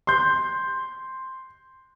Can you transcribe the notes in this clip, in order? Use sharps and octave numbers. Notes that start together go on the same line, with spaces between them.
C6 G6